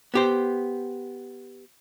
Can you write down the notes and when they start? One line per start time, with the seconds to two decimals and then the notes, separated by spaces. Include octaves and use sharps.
0.14 B3 G4 C5